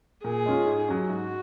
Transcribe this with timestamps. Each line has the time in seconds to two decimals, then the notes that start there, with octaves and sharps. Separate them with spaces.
0.24 A#2 G#4
0.46 G#3 C#4 F4
0.67 G#2
0.88 F#3 C#4
1.09 G#2 F#4